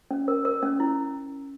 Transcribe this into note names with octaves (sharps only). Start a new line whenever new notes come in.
C#4
A#4
A#4
C#4
E4